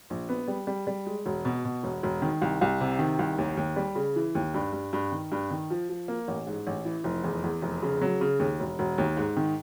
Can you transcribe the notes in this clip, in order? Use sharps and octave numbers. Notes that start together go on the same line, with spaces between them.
A#1
B3
G3
G3
G3
G#3
E1
B2
B2
E1
E1
D#3
C2
C2
C3
D#3
C2
D#2
D#2
G3
C#3
E3
D#2
G2
G2
G2
D#3
G2
D#3
F3
F3
A#3
A1
G#2
A1
E3
F1
E2
E2
F1
C#3
F#3
C#3
D#2
E1
E1
D#2
G#2
D#3